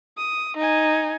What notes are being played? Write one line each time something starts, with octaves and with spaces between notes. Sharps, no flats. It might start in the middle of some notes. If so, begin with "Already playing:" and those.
D#6
D#4 G#5